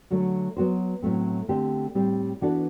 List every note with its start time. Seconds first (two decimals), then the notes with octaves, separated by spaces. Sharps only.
0.11 D3 F#3 A3
0.57 F#3 B3 F#4 C5
1.02 A2 F#3 A3 C4
1.48 D3 A3 C4 G4 C5
1.95 A2 G3 C4 G4
2.41 E3 B3 D4 F#4 A4